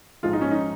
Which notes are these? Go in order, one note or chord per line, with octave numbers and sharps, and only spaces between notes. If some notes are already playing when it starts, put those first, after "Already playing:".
A#1 G#2 F3 G#3 F4
D#4
C#4
D#4